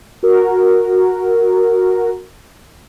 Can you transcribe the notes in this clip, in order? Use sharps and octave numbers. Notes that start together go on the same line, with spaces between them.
F#4 A#4